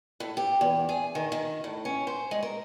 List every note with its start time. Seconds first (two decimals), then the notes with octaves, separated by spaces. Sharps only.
0.20 A2
0.37 G4
0.61 E2
0.89 G#4
1.15 D#3
1.32 D#3
1.64 A2
1.85 C#4
2.07 C5
2.31 G#3
2.43 A#4